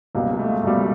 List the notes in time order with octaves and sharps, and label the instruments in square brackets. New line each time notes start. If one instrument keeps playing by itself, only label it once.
[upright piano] C#2 B2 G3 [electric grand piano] A#3
[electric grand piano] A#3
A3
G#3
[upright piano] C#2 B2 G3 [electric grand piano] A3